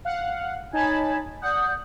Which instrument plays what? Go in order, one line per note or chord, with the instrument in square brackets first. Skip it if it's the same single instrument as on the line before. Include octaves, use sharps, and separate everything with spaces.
[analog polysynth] F5 F#5
[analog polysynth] D#4 A5 B5 [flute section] C#5 G#5 G#6
[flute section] D5 D#6 G6 [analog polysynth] F#5